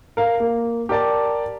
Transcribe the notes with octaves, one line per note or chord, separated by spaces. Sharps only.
A#4 F5
A#3
G4 A#4 D5 A5